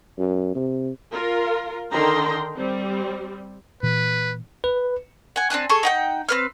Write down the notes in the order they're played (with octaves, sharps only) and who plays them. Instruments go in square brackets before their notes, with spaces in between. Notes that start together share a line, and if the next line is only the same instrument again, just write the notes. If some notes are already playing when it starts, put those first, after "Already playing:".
[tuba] F#2
C3
[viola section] F4 A#4
D3 D#3 G5 A#5 C6
G3 C4
[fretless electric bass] A#2 E3 [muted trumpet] B4
[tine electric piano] B4
[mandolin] F#5 G#5
C4 D4 G#5 F#6
G#4 A4 C#6
D#4 F#5 G5
C4 B4 F6